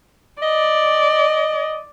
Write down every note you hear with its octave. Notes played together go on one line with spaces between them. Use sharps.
D5 D#5